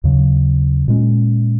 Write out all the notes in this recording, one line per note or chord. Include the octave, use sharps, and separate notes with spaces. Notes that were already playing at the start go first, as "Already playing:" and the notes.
D#2 C#3 F#3
A#2 G#3 C#4